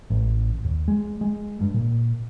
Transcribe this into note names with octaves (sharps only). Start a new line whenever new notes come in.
A1
D#2
G#3
G#3
G2
A#2